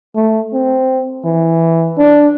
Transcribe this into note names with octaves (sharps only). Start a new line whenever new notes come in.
A3
C4
E3
D4